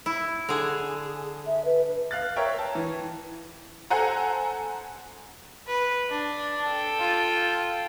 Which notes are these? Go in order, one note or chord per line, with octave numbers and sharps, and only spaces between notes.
E4
D3 G#4
E5
B4
F5 F#6 A6
A#4 C#5 E5 G5
A5
E3
A4 C5 F#5 G#5 A#5
B4
D4
A4 G5
F4